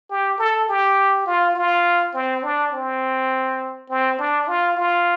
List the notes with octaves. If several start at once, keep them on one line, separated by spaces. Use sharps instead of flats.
G4
A4
G4
F4
F4
C4
D4
C4
C4
D4
F4
F4